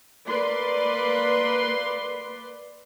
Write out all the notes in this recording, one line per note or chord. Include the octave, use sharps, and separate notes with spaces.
A#3 B4 D5 C6